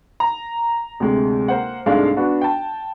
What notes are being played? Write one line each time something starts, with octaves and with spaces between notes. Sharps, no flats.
A#5
D2 C3 G#3
A#3 C5 F#5
C2 G#2 G#3 A3 D4 F5
B3 D4 F#4
G5 A5